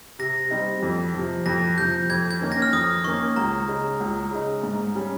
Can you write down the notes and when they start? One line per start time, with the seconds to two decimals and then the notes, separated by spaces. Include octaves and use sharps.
0.19 C3 A#6
0.51 G3 C4 D#4
0.83 F2
1.14 C3 F3
1.46 F2 A#6
1.78 C3 F3 G6
2.10 F2 G#6
2.31 G#6
2.41 D#3 A#3 C#4
2.52 A#6
2.62 F6
2.73 F2 D#6
3.04 D#3 A#3 C#4 C#6
3.36 C#2 A#5
3.68 C#3 G#3 D#4
4.00 C#2
4.31 C#3 G#3 D#4
4.63 G#2
4.95 G3 C#4